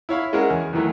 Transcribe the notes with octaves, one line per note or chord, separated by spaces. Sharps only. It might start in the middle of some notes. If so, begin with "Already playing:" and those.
E4 C#5 F5 B5
G#3 C#4 E4 F#4 A#4
E2
E2 D#3 E3 F#3 A3